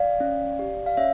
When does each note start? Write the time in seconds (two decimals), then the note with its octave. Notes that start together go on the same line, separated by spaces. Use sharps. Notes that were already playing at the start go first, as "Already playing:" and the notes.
Already playing: D5 F5
0.20 C#4
0.59 G4
0.86 F5
0.97 C#4 C#5 E5